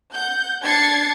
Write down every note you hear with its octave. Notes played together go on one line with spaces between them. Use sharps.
F#5 G6
D4 G#6 A6 C7 C#7